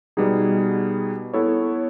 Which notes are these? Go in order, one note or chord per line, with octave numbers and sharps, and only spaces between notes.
B2 G3 B3 D#4 G#4
B3 E4 A4 C#5